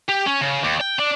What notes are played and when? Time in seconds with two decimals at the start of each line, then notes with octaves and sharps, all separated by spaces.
0.09 G4
0.26 C#4
0.41 C#3
0.64 D#2
0.81 G5
0.99 D4